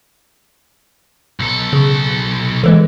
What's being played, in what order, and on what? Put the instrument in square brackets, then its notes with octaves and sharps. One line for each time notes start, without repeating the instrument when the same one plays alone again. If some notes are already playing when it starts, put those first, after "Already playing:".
[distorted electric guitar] B1 A4
[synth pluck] C#3
D3 E3 G#3